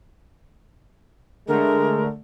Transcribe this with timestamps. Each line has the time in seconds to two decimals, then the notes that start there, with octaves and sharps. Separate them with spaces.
1.48 D3 G#3 A3 A#4